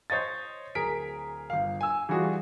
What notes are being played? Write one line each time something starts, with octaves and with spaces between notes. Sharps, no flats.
C5 C#5 D#5 A6
D1 G#4 A#4 B6 D7
G1 F5
G#5 E6
E3 G3 F4 F#4 G#4